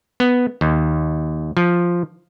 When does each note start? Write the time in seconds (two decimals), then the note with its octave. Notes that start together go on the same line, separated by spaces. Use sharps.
0.20 B3
0.61 D#2
1.57 F3